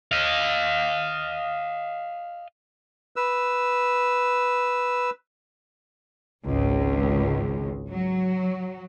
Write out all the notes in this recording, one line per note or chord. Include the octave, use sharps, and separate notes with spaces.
D#5 F5
B4 E6
G#1 C#2
F#3